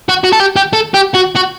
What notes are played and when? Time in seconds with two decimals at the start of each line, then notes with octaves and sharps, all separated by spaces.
0.09 F#4
0.24 F#4
0.33 A4
0.40 G4
0.56 G4
0.73 A4
0.94 G4
1.15 F#4
1.36 F#4